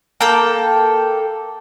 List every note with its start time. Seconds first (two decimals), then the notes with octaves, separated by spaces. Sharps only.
0.21 A#3 A4 G5